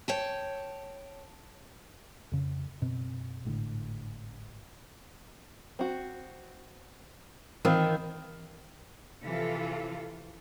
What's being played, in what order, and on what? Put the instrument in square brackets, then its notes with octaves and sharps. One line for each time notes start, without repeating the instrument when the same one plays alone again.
[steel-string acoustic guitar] C#5 G5 A5
[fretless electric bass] F2 C#3
F#2 B2 C4
G#1 A2 D3
[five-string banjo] C4 F#4
[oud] D#3 [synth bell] E3 [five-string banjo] C4 F4
[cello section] C3 E3 F3 F4 A4 F5